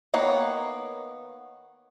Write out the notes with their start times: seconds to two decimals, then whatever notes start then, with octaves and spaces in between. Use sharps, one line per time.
0.14 D#3 A#3 B3 C#5